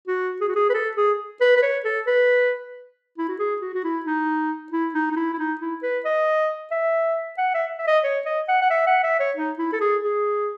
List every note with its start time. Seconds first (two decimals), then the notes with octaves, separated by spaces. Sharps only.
0.08 F#4
0.41 G#4
0.48 F#4
0.55 G#4
0.69 B4
0.74 A4
0.97 G#4
1.40 B4
1.57 B4
1.62 C#5
1.84 A4
2.07 B4
3.18 E4
3.29 F#4
3.39 G#4
3.61 F#4
3.74 F#4
3.84 E4
4.05 D#4
4.72 E4
4.94 D#4
5.11 D#4
5.17 E4
5.33 E4
5.38 D#4
5.60 E4
5.83 B4
6.05 D#5
6.71 E5
7.38 F#5
7.54 E5
7.78 E5
7.87 D#5
8.04 C#5
8.26 D#5
8.48 F#5
8.62 F#5
8.70 E5
8.87 F#5
9.03 E5
9.20 C#5
9.36 D#4
9.58 E4
9.73 A4
9.81 G#4
10.03 G#4